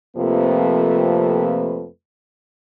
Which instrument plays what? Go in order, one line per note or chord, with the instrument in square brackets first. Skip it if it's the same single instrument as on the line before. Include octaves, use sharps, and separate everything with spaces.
[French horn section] F2 C3 F3 A3 A#3 B4